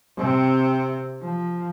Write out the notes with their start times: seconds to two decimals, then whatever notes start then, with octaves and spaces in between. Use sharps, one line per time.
0.17 C3 C4
1.21 F3